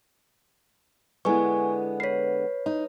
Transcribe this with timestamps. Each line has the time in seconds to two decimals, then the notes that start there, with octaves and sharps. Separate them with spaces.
1.25 D3 G#3 B3 E4 B4 G#5 C#6
2.00 B4 C#5 B6 C7
2.66 D#4